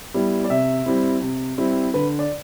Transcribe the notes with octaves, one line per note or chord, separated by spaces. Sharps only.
G3 B3 E4
D5
C3 E5
G3 C4 E4
C3
G3 C4 E4
D3 B4
D5